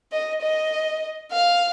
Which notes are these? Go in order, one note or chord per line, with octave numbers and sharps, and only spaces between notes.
D#5
D#5
F5